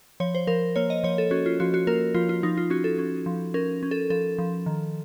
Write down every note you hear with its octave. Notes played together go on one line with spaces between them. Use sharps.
F3 C#5
C5
F3 A#4
A#3 C#5
D#5
F3 C#5
A4
C#4 F#4
F4
F3 F#4
F#4
A#3 A#4
F3 F4
F4
F3 D#4
F4
C#4 F#4
A4
C#4
F3
C#4 A#4
C#4
A4
F3 A4
F3
D#3